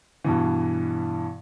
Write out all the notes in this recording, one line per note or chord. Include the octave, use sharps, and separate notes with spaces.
G2 B2 E3